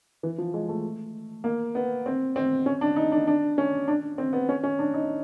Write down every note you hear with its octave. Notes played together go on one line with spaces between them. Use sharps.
E3
F3
G#3
A3
A#3
B3
C4
C4
C#4
D4
D#4
D4
D4
C#4
D4
C4
B3
C#4
C#4
D4
D#4